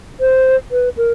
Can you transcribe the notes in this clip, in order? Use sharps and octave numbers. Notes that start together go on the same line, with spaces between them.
C5
B4
A#4